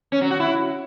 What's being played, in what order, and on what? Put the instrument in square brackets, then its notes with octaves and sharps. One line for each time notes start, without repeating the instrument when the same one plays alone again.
[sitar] C#4
F#3
F#4
E4